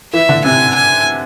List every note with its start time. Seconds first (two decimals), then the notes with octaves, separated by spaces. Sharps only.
0.13 E3 E5
0.29 D3
0.45 C3 G#5
0.75 G#5